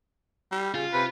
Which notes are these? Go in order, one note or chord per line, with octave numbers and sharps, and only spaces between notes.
G3
C#3 F4
C3 B4